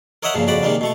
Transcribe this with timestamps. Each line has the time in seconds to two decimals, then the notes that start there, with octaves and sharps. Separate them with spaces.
0.23 A#4 C#5 D#5 E5 F#5 A#5
0.35 G2 A#2 C#3 F3
0.47 F2 C#3 F#4 D5 B5
0.63 C3 D#3 G3 G#3 A#3
0.81 B2 A3 C#6